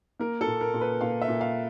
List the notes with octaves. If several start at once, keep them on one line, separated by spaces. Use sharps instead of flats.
A#3 A#4
A4
A#2
A#4
A#2
B4
A#2 F5
E5
A#2
F5